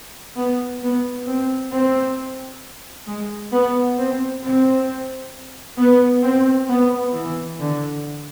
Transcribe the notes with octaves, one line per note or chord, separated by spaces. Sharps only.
B3
B3
C4
C4
G#3
B3
C4
C4
B3
C4
B3
E3
D3